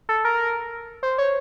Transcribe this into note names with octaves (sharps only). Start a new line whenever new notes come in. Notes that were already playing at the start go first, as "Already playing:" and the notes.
A4
A#4
C5
C#5